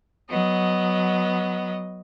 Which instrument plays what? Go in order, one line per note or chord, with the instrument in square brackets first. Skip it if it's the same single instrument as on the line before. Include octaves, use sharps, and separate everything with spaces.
[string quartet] F#3 B3 D#5